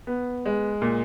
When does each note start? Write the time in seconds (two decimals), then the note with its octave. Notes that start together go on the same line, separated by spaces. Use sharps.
0.07 B3
0.46 G#3
0.82 A#2